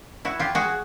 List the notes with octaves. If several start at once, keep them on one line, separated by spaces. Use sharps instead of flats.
E4 F#4
F4 G4
F#4 G#4